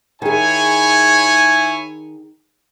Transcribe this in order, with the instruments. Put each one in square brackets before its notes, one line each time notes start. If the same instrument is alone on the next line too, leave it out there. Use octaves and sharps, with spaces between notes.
[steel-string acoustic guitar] D#3 G#4 [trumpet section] E4 C#5 G#5